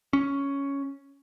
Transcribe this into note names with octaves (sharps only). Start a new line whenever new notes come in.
C#4